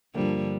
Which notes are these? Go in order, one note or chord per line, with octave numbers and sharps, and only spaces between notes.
G2 D3 F3 G3 A#3